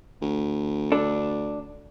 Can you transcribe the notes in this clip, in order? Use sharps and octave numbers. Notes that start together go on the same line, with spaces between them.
D2
D4 A4